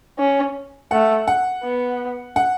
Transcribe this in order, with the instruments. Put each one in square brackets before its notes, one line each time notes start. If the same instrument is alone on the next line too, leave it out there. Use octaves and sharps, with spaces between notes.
[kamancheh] C#4
[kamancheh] A3 [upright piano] F#5
[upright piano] F#5
[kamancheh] B3
[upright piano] F#5